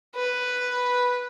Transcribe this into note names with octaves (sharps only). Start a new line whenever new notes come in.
B4